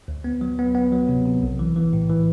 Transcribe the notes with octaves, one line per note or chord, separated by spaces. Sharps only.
D2
B3
F#3
B3
B3
F#3
C3
C3
B1
E3
E3
A2
E3